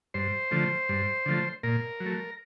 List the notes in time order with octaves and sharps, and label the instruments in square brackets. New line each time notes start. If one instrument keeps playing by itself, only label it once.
[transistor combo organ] G2 C5
D3 F3 A3
G2
D3 F3 A3
A#2 A#4
F#3
A3